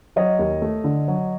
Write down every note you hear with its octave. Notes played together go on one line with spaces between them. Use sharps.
F#3 C#5 D#5
D#2
A3
D3
F#3